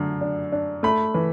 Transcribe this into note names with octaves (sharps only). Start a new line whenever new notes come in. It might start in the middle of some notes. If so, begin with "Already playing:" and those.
Already playing: F#2 D3 A3
D4
D4
A3 B5
E3